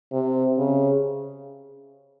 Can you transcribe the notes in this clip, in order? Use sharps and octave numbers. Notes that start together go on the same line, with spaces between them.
C3
C#3